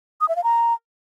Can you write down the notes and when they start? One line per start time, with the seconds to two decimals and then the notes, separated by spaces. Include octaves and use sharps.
0.21 D#6
0.29 E5
0.36 F5
0.44 A#5